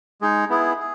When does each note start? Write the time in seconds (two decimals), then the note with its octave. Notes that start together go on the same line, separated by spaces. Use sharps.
0.21 G#3 D#4 G#4
0.50 B3 E4 G#4
0.79 G#4